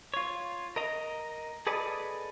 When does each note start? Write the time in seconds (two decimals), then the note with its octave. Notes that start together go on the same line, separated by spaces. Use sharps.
0.14 F4 C#5
0.76 A#4 D#5 A#5
1.67 G#4 A4 B4 D5 D#5